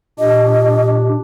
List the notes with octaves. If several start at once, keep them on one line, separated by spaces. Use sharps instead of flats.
A#2 D4 G4 D#5